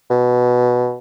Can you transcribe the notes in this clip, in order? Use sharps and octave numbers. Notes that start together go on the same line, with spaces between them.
B2